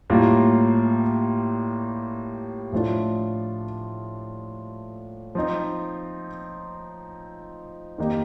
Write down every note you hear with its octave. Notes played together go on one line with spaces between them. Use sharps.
A2 G3 A#3 F4
A2 F3 A3 D4 F4
F3 C4 D#4
F2 D#3 A#3 D#4 G4